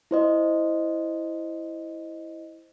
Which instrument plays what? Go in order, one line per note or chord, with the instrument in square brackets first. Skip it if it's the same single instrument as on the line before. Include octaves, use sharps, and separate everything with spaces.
[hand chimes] E4 C5 D#5